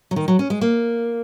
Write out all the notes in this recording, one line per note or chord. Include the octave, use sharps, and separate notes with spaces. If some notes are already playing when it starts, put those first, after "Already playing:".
F#3
D#3
F#3
C#4
G#3
A#3